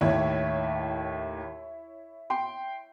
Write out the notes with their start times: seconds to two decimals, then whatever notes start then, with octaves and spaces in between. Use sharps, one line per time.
0.01 D#2 A2 E4 C#5
2.30 G5 C6